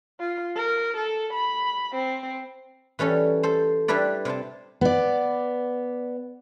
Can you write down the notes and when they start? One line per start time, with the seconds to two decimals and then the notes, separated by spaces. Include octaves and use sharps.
0.20 F4
0.56 A#4
0.97 A4
1.33 B5
1.95 C4
2.99 E3 G3 C#4 A4
3.43 A4 C5
3.88 G3 D4 E4 B4 D5
4.25 C3 E4 C5 A5
4.81 B3 D5